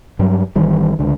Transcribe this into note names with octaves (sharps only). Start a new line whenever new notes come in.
G2 F#3 G3
G#1 D#3 E3 G3
C#2 D3